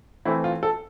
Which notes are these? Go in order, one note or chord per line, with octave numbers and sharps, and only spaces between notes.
E3 A3 C4 E4
F4
A4